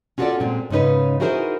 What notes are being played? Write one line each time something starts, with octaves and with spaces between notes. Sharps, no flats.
C#4 F4 F#4 G#4 A4 D5
A#2 G#3 C4
G#2 C#3 C#4 D#4 B4
D#4 E4 F#4 G#4 A#4 C5